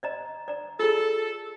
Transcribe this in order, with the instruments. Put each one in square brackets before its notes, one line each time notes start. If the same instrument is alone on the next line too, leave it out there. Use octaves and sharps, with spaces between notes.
[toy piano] D5 D#5 A#5
D5 A#5
[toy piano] F4 G#4 [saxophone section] A4